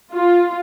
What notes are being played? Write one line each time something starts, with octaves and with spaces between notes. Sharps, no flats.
F4